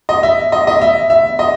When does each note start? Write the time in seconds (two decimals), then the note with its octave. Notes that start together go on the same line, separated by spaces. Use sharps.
0.09 D#5
0.23 E5
0.52 D#5
0.67 D#5
0.81 E5
1.10 E5
1.39 D#5